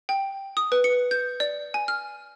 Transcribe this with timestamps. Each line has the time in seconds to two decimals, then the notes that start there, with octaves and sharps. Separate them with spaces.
0.09 G5
0.57 D#6
0.72 B4
0.84 C#7
1.11 G6
1.40 D5
1.74 G#5
1.88 F6